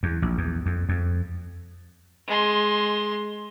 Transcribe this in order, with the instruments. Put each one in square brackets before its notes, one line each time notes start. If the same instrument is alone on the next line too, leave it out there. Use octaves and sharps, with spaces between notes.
[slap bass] E2
A#1
E2
F2
F2
[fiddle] G#3 C6